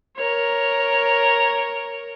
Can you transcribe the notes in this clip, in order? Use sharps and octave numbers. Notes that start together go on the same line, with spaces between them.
A#4 C#5